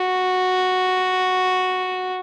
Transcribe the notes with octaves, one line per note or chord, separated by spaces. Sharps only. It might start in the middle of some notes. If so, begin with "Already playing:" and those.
Already playing: F#4